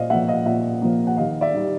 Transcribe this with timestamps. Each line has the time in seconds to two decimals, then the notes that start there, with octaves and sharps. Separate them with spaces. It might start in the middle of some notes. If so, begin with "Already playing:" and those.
Already playing: A#2 C5 D5 D#5 F5
0.10 F3 A#3 E5 F#5
0.28 D#5 F5
0.46 A#2 E5 F#5
0.82 F3 A#3
1.07 F#5
1.17 D#2 D#5 F5
1.41 D5 E5
1.54 D#3 G3